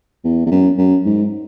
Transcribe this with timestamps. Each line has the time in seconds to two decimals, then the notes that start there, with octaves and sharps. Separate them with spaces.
0.24 E2
0.46 E2
0.51 F#2
0.78 F#2
1.05 G#2